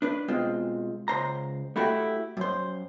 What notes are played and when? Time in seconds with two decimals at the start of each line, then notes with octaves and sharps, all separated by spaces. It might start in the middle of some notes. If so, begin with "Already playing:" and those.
0.02 D4 B4
0.28 B2 G#3 C4 F4
1.08 C#2 C5 A#5
1.76 A3 E4 F#4 G4
2.37 F#2 C5